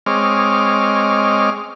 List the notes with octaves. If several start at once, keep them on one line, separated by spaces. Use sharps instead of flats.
G#3 C4 C#5 D#5 D6 F6